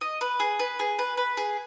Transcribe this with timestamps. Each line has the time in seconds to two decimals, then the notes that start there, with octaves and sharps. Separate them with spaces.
0.01 D#5
0.21 B4
0.40 G#4
0.59 B4
0.80 G#4
0.99 B4
1.17 B4
1.37 G#4